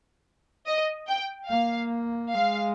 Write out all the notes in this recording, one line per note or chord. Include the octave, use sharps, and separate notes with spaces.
D#5
G5
A#3 F5
G#3 F5